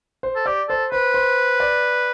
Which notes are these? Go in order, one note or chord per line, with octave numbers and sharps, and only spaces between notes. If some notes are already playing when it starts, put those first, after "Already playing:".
C5
A4
G4 D5
A4 C5
B4 C5
C5
D5